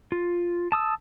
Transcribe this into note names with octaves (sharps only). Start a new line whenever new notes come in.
F4
A5 D#6 E6